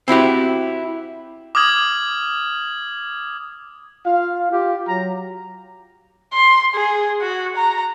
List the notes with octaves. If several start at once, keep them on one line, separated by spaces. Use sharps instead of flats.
C4 E4 F#4 G4
D6 D#6 F6 G#6 F#7
F4 F5
F4 G4
F#3 A#5
C6
G#4
F#4
A#5